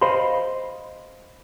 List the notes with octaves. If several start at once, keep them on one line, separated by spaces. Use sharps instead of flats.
C5 D#5 F5 B5 C6